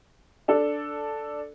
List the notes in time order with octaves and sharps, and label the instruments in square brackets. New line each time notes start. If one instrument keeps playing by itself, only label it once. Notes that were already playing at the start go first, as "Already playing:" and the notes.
[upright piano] D4 A4